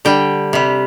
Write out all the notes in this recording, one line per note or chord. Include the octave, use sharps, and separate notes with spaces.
D3 G3 G5
C3 G3